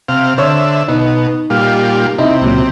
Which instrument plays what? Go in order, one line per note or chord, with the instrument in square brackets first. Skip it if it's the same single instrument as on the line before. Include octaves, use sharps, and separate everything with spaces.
[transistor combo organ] C3 F5
[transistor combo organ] D3 E5 [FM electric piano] C5 C#5
[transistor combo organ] B2 [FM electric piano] D#4
[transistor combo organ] A#2 G3 F4
[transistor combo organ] C3 [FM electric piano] D#4 E4
[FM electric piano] C#2 A#2 F#3